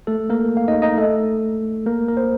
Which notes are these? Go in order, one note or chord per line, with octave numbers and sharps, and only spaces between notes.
A3 A4
A#3 A#4
F5
D#4 D#5
D#4 D#5
A3 A4
A#3 A#4
A#4
C5